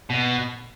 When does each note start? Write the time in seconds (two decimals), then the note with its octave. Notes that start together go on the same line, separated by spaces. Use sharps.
0.10 B2